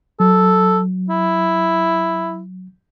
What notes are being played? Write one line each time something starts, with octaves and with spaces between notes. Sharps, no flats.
F#3 A4
E4